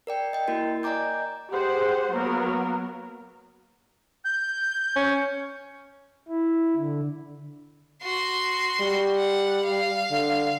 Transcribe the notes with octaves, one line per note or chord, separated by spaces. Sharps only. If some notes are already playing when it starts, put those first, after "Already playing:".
A#4 D5 G5
D#5 G5
A#3 E4 F#4 A#4
D5 D#5 G#5 A#5 D6 G6
G4 G#4 C5 F#5
F#3 A#3 B3 A#4
G6
C#4
E4
D3
F#4 C6
G3
F#5
F5
D3